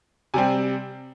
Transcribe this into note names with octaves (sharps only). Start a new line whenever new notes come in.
C3 G3 C4 G#5